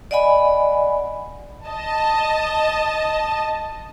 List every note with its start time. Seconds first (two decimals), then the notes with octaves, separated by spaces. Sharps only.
0.11 D5 D#5 F#5 G#5 B5
1.67 D#5 A5